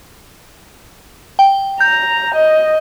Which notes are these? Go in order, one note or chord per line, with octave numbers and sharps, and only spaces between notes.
G5
A#5 G6
D#5